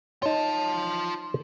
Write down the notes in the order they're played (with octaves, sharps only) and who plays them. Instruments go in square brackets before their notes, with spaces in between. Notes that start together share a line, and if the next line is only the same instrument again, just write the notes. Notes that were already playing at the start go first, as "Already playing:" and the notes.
[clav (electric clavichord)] D#4 C#5 [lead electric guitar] F4 A5